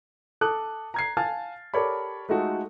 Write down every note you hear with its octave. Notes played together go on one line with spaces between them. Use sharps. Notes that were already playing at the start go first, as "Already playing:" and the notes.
A4 A5 D6 D#6 F#6
A#5 G#6 C7
F5 G#5 A5 F6 A6
G4 A4 A#4 C#5 D5 B5
G#3 A3 D#4 F4 F#4 A4